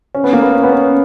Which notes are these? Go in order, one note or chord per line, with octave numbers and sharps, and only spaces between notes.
C#4
B3
A#3
B3
C#4
B3
C#4